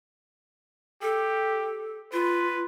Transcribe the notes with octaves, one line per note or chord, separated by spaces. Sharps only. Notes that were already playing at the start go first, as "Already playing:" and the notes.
G4 A4
F4 B4